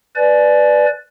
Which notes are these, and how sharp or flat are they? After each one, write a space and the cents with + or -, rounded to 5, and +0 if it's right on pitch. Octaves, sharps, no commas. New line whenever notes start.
B4 +0 D5 +10 G#5 +40